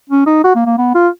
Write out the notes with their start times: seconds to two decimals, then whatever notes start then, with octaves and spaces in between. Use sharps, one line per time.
0.10 C#4
0.26 D#4
0.44 F#4
0.56 A#3
0.66 A#3
0.78 B3
0.95 F4